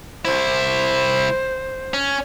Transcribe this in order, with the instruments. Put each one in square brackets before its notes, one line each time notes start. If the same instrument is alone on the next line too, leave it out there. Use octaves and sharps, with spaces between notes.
[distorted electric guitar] C2 E4 [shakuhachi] C5
[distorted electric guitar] C#4